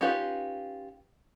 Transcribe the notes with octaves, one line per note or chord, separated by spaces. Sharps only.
C#4 D#4 F4 G4 B4